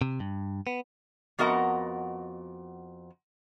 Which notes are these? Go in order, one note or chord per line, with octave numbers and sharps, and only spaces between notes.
C3
G2
B3
F2 B3 F#4 A#4 D#5 F#5